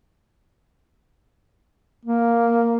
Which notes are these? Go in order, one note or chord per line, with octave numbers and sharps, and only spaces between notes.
A#3